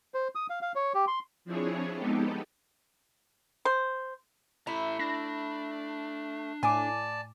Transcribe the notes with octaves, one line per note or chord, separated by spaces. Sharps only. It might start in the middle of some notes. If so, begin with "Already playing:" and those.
C5
D#6
F5
F5
C#5
G4
C6
F3 C4 D4 E4 G#4 C#5
G#3 B3 D#4 G4 A4
C5
A3 E4 E5 A#5
D4 A#6
A2 D5 G#5 A5 D6